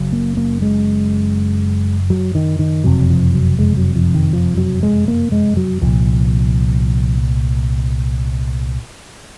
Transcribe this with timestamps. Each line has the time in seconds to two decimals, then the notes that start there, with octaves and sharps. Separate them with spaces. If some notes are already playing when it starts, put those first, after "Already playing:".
Already playing: F#1 F#2 C#3
0.13 A#3
0.37 A#3
0.62 G#3
2.10 F#3
2.35 D#3
2.59 D#3
2.84 F#1 F2 C3 F#3
3.10 F3
3.34 F#3
3.59 G#3
3.77 F#3
3.95 F3
4.14 D#3
4.33 F3
4.58 F#3
4.83 G#3
5.08 A#3
5.32 G#3
5.57 F#3
5.81 C2 A#2 F3